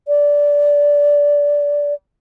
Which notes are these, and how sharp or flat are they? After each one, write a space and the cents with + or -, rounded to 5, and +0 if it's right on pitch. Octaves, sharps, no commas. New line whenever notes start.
D5 -15